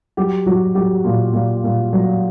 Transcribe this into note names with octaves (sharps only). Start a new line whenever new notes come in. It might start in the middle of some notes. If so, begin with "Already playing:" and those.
F#3 G4
F#3 F#4
F#3 G4
A#2
A#2
A#2
F#3